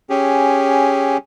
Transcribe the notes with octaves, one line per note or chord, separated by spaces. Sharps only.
C#4 G4 G#4